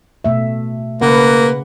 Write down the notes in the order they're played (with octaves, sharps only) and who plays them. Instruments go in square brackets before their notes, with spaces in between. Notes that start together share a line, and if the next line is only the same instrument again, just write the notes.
[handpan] B2 A3 E5
[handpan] C#3 C#4 F#5 [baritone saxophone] A#3 [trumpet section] B4